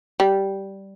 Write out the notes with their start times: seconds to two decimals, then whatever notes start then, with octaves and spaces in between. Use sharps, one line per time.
0.20 G3